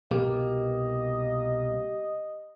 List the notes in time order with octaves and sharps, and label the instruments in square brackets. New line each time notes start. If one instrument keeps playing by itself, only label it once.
[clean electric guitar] C2 B2 A#3 [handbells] G4 [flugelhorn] D#5